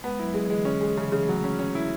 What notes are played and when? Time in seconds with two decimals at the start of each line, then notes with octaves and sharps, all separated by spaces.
0.03 G#3 B3
0.19 F#3 E4
0.34 F#3 G#3
0.45 E3
0.50 G#3
0.55 D3
0.65 C#4
0.81 G#3
0.97 C#3 E3
1.05 F#3
1.12 C#3 E3
1.23 A3
1.28 F#3 G#3
1.44 C#4
1.59 C#4
1.75 E4